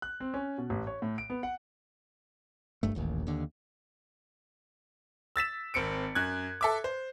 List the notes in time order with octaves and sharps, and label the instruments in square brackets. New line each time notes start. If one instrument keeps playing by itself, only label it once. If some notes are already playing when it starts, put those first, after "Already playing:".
[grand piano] F#6
C4
C#4
B2
A1
C#5
A2
D7
B3
F#5
[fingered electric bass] F#1 G2 A3
D#1 A1 D#2
D#2 D3
[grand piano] E6 A6 B6 E7
G#1 C4 C#7 D7
F#2 F#6 G#6
A4 E5 D6
C5